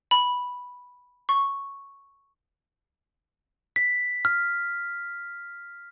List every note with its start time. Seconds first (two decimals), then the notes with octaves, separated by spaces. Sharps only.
0.11 B5
1.29 C#6
3.76 B6
4.25 F6